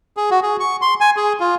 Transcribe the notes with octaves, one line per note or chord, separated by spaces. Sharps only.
G#4
F#4
G#4
C#6
C6
G#5
G#4
F4